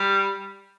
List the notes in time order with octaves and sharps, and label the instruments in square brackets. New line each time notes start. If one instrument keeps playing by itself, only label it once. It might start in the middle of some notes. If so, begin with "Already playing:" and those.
Already playing: [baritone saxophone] G3